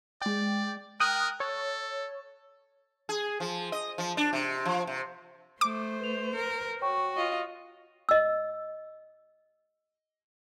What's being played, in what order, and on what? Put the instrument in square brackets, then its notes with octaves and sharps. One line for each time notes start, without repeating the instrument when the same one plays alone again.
[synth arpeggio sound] G#3 G5 [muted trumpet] D5
[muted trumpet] A#4 [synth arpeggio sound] G5 D#6 F#6
[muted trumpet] A4 [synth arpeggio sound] C#5
[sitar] G#4
F3
D#5
F3
D4
C3
F3
C3
[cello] A3 [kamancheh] C5 [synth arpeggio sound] D6
[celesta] B4 F7
[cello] A#4
[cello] F#4 [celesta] C#5 G5 C#6
[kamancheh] F4 D#5
[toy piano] D#5 E6